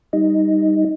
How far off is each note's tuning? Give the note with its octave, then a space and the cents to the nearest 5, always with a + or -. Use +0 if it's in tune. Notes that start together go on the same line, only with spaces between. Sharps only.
G3 +0 D#4 +5